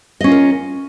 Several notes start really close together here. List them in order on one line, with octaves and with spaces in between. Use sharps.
D#5 C#4 F4 A#4